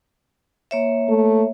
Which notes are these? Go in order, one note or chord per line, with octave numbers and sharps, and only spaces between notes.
A#3 C#5 E5
A3